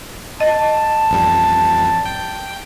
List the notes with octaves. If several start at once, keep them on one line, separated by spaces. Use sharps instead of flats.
D#5 A5
A1 F2 G3
G5